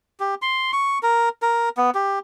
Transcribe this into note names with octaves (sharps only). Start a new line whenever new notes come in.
G4
C6
C#6
A#4
A#4
B3
G4